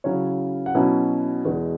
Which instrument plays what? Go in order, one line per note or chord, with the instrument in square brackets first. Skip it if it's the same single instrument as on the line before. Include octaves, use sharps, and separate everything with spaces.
[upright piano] C#3 F#3 C#4 E4 C#5
F#5
B2 F#3 C#4 E4 E5
E2 B2 G#3